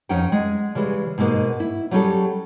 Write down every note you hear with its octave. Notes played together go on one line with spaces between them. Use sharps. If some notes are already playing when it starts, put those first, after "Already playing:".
F2 C#4 D#4 F#5 G5
G#3
C#3 E3 G3 G#3
G#2 B2 G#3 A#3
E4
F#3 G3 C#4 F4 G#4 A4